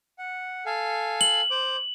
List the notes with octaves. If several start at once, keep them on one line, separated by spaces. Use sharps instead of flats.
F#5
A4 F5 G#5
F#7
C5 D6